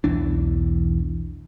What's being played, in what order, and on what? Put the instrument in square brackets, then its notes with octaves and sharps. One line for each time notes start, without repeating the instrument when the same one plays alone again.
[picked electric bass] B1 E2 E3 D4